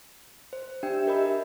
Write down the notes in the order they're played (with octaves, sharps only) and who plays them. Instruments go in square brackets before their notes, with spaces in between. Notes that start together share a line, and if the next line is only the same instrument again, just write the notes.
[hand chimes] C5
[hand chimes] D4 G5 [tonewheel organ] G4 E5
[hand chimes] A#4 D#5 B5